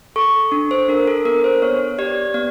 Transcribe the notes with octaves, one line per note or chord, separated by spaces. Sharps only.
A4 C#6
D4
C5
D4 A#4
A4
B3 A#4
C5
B3 C#5
G4 D5
B3 D5